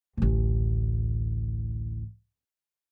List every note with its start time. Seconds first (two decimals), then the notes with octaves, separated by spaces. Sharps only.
0.17 A1 D2